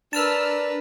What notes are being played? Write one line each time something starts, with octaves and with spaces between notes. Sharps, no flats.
D4 A#4 B4 A5 E6 F6